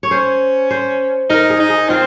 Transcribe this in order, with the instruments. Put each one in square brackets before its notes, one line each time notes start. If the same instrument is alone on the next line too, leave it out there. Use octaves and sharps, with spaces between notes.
[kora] C#5
[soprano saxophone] C#4 [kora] C5
[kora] C5
[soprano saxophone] D#4 [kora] A#4
[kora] G#4
[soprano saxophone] D#4
[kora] G#4
[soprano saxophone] C4 [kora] F4